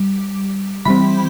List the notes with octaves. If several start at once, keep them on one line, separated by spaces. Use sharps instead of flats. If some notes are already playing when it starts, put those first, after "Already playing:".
Already playing: G3
E3 G3 C4 B5